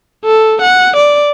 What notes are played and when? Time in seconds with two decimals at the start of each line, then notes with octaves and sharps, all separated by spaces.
0.25 A4
0.62 F#5
0.96 D5